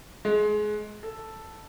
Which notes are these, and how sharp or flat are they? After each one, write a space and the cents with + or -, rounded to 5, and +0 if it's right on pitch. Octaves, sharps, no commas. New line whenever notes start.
G#3 +25
A4 +0